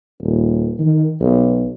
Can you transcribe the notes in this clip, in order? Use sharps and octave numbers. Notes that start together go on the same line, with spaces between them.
D#1
D#3
B1